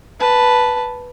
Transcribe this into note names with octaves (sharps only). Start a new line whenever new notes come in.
B4 A5